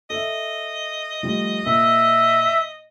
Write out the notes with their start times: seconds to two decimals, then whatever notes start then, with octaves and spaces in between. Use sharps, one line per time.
0.10 A4 D#5 E5
1.23 F3 G3 A3
1.66 A#2 E5